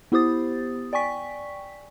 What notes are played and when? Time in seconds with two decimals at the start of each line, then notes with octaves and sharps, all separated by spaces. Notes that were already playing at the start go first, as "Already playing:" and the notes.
0.12 B3 E4 G4 C5 D#6 A6
0.93 D5 G5 G#5 C#6 B6